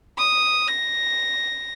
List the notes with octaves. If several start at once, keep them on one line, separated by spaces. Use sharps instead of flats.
D#6
A#6